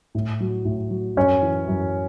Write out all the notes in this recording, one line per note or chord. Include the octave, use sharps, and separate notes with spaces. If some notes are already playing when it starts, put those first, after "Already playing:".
A2
F#3
A2
F#3
F#2 C#4 C#5
E3
F#2